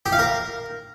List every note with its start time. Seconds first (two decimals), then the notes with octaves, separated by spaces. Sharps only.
0.06 G4
0.12 F5
0.19 A#4